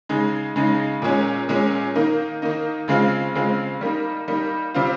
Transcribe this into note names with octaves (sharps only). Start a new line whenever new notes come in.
C#3 G#3 D#4
C#3 G#3 D#4
A#2 G#3 C#4
A#2 G#3 C#4
D#3 A#3 D#4
D#3 A#3 D#4
C#3 G#3 C4 F4
C#3 G#3 C4 F4
G3 A#3 D#4
G3 A#3 D#4
C3 G3 C4 F4